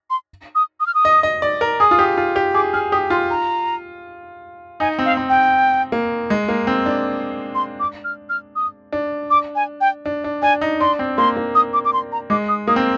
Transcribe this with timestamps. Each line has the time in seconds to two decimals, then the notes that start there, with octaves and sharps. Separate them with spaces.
0.10 C6
0.55 D#6
0.80 D#6
0.87 F6
0.95 D#6
1.05 D#5
1.23 D#5
1.42 D5
1.61 A#4
1.80 G#4 D#6
1.91 F4
1.99 G4
2.17 F4
2.36 G4
2.54 G#4 D6
2.73 G#4 F6
2.92 G4 D#6
3.10 F4 C6
3.30 A#5
4.80 D#4 G#5
4.99 C4
5.05 F5
5.17 C4
5.29 G5
5.92 A#3
6.30 G#3
6.48 A#3
6.67 C4
6.86 D4
7.55 C6
7.80 D6
8.04 F6
8.30 F6
8.56 D#6
8.92 D4
9.30 D6
9.55 G#5
9.81 G5
10.06 D4
10.24 D4
10.42 D4 G#5
10.61 D#4
10.80 D4 C6
10.99 C4
11.17 A#3 C6
11.36 A#3
11.55 D#6
11.73 D6
11.85 D6
11.93 C6
12.12 A#5
12.30 G#3 D6
12.48 D#6
12.67 A#3 D#6
12.76 C4